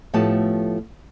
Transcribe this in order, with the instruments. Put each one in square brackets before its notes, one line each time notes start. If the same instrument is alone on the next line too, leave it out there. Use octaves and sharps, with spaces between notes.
[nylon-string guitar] A2 F3 A3 B3 G4 A5